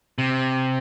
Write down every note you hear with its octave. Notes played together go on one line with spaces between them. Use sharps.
C3